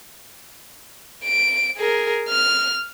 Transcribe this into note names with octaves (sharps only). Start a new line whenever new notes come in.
D7
G#4 A#4
F6